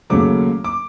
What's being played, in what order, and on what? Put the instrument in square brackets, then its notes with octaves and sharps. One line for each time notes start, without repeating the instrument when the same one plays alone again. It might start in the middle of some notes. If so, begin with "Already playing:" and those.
[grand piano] D#2 C#3 F#3 A3 D6
D6